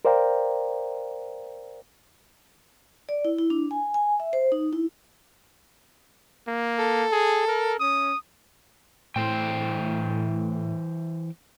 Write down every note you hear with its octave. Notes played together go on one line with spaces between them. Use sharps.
A#4 C5 D5 F5 G5 A#5
D5
E4
E4
D4
G#5
G#5
E5
C5
D#4
E4
A#3
A4
G#4
A#4
C#4 D#6
A2 E3 C5 G5